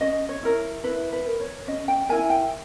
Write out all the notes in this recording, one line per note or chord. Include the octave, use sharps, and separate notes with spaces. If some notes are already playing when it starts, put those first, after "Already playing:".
C#4 D#5
C#5
E4 A#4
E4 B4
B4
A#4
C#5
C#4 D#5
G5
E4 A#4 G#5
G5